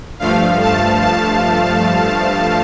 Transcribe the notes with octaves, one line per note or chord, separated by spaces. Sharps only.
G2 F3 A3 F5
A5
A5